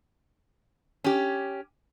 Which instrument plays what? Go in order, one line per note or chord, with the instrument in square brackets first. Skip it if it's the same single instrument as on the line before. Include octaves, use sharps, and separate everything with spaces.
[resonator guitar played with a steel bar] C#4 G4